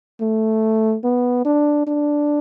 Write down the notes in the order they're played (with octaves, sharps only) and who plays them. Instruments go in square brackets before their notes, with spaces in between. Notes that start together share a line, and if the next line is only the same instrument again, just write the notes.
[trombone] A3
B3
D4
D4